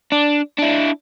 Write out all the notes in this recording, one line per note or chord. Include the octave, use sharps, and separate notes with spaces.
D4
D4 E4